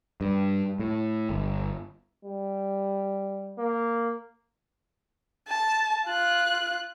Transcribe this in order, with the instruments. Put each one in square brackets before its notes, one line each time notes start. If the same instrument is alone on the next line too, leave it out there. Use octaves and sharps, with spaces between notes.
[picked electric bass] G2
A2
G1
[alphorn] G3
[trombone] A#3
[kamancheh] A5
F4 F#6